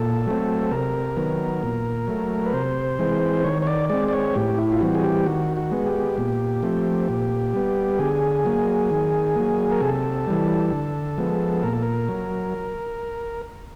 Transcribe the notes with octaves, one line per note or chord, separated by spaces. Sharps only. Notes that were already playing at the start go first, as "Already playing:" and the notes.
Already playing: A#2 A4
F#3 A3 C4
C3 A#4
D#3 F#3 B3
A#2
F#3 A3
B4
C3 C5
E3 G#3 C4
D#3 C#5
C#5
D5
G#3 C4 D5
D5
C#5
A2 G4
E4
F4
E3 G3 C4 F#4
G#4
G4
D#3 F#4
F#4
G#3 B3
G4
A#2
F3 A3 C4
A#2
G3 B3
D3 G#4
F#3 A#3
D#3
F#3 A#3
A#4
C3 A4
E3 G3
D3
F3 G#3 B3
A#2 A#4
A4
A#4
F#3